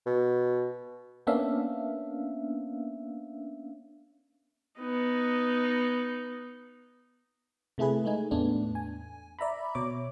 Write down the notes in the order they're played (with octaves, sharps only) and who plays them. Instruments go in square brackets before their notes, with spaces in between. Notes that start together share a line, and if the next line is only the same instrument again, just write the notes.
[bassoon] B2
[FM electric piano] A#3 B3 C#4 D4 E5 F5
[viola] B3 D#4
[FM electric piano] C3 A3 E4 G#4 B4
G#3 A3 D#4 G#5
E2 A2 A3 B3 D4
G#5
D5 E5 A#5 B5
B2 C#5 D6